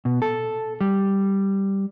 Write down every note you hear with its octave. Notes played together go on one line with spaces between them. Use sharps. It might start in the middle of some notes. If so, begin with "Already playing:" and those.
B2
A4
G3